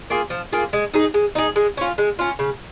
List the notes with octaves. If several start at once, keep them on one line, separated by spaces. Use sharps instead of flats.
A#3 F4 G#4
F3
A#3 F4 G#4
G#3
D#4 G#4
G#3
D#4 G#4
G#3
C#4 F4
G#3
C#4 F4
C#3